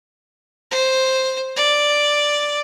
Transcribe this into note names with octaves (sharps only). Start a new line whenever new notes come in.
C5
D5